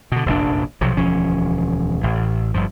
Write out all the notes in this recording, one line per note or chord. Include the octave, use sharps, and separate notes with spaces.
B2 D3
F1 A#1 F#2 D4
B1 C3 F3 F#3
E1 D2 F3 C#4
A1
G1 G2 F3